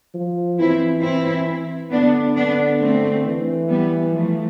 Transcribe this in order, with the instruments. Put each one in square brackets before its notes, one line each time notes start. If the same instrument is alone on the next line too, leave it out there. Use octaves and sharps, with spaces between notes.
[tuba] F3
[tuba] E3 [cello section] C4 E4
[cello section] C4 E4
[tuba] D3 [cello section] B3 D4
[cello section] B3 D4
A3 C4
[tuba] E3
[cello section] G3 B3
F3 A3